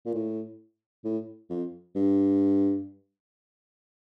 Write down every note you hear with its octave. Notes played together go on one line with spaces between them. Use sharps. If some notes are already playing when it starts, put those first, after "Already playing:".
A#2
A2
A2
F2
G2